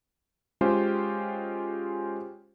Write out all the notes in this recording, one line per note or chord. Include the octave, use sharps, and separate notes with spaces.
G#3 C#4 F4 G4 C5 G5